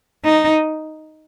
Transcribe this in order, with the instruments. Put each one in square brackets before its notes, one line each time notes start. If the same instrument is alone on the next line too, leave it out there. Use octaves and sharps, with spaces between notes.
[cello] D#4